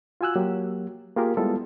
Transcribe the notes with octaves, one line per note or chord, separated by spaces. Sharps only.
F4 F#4 G#5 E6 F#6
F#3 A#3 G4
A#3 F4 G4 G#4 A#4
G3 G#3 B3 E4 F4 A4